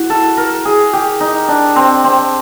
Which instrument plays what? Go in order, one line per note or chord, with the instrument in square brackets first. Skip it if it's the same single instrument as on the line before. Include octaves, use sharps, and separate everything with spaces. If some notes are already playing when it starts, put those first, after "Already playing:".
Already playing: [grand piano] E4 [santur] F#4
[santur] A4
A#4
G#4
G4
D#4
D4
C4
C4